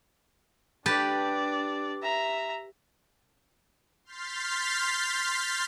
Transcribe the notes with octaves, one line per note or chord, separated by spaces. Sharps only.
D4 G4 B4 D5 A5
E5 A#5
C6 F6 G6 A6 B6 C7